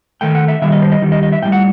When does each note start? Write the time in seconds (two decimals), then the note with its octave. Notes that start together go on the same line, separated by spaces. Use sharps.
0.21 D#3 A3 G5
0.35 F#5
0.48 E5
0.62 D#3 G3 E5
0.72 D#5
0.82 C5
0.92 D#5
1.02 D#3 G3
1.12 D#5
1.23 D#5
1.32 E5
1.42 A2 G3 G5
1.52 F#5